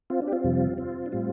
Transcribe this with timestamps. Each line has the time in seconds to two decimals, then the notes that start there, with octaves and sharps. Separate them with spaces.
0.10 C4 F4
0.22 D4
0.27 G4
0.32 C4 F4
0.44 F2 C3 G3
0.78 C4 F4
1.06 D4
1.12 A2 G3 C4 F4